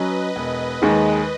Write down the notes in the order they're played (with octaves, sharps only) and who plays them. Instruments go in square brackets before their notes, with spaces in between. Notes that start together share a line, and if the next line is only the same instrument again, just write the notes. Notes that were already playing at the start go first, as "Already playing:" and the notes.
Already playing: [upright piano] F#3 C#4 [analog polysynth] B4 D#5
[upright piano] E1
D#2 D#3 G#3